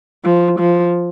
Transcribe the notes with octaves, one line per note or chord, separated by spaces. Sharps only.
F3
F3